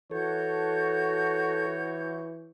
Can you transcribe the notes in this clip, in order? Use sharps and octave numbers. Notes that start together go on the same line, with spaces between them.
E3 F#4 A4 C#5 F#5 G6